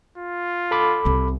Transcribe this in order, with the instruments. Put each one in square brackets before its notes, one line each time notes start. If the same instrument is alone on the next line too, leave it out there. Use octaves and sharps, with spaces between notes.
[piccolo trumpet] F4
[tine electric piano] A4 B5 D6
[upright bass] C2 C3